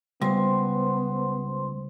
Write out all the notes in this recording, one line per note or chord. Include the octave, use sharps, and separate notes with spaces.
C#2 G3 B3 C5 C6